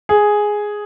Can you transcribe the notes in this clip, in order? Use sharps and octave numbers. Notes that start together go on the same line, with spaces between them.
G#4